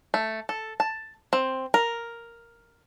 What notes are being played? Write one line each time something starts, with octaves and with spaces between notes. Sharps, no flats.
A3
A4
A5
C4
A#4